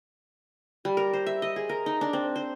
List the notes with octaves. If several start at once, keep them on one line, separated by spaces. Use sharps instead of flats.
G3
A#4
C5
E5
D#5
G#4
A#4
D#4
D4
C4
C5